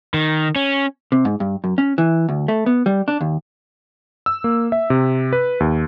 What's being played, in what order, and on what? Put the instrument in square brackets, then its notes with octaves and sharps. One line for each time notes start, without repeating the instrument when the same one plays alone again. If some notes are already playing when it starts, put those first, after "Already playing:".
[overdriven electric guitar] D#3
C#4
[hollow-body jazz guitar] C3
G#2
G2
F#2
C#4
E3
D2
A3
B3
G3
D4
D#2
[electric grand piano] E6
A#3
E5
C3
B4
D#2